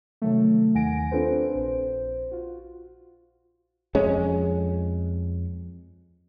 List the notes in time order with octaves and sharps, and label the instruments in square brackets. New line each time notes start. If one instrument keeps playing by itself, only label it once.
[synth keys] C3 D#3 F#3 A3
D#2 D#3 F#5 G#5 A#6 D7
C4 D4 F4 A4 B4 C5
A#1 C5
F4 F#4
[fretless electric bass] F2 G#3 C#4